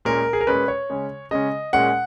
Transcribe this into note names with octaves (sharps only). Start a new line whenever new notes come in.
A#2 G#3 C#4 A#4
G#4
A#4
A#2 G#3 C#4 B4
C#5
C#3 G#3 C#4
C#3 G#3 C#4 D#5
A#2 G#3 C#4 F#5